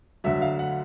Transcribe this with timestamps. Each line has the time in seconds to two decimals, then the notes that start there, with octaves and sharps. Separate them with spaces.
0.24 D2 D3 F#3 E5
0.42 F5
0.59 F#5